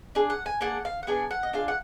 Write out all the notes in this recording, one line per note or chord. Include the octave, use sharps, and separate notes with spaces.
D4 G#4
F#5
G#5
A#3 D4 G#4 F#5
F5
F#5
B3 D4 G#4 G#5
F#5
D#5
D4 F4 G#4 F5
F#5